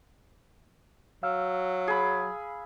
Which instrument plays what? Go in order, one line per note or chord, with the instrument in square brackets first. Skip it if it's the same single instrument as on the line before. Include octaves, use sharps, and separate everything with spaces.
[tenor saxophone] F#3 [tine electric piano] F5 E6 F6
[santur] G#4 B5